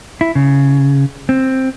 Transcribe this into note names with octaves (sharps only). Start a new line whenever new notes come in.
E4
C#3
C4